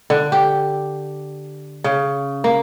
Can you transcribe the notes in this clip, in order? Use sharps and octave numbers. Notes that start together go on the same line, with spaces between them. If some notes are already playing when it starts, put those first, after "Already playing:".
D3
G4
C#3
A#3